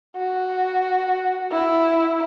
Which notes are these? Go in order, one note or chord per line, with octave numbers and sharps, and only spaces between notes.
F#4
E4